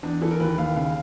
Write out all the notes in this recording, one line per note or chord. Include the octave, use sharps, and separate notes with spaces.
E2 D4
E3 A4
A#4
D#2 B4
D#2 F5
C#3 F5